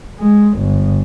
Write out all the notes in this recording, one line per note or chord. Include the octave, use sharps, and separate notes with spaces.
G#3
G1